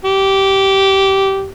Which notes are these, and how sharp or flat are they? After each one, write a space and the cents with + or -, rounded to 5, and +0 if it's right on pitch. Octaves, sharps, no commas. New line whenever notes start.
G4 -15